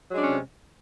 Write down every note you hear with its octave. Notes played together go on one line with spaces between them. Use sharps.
C3 F#3 G#3 C#4 D4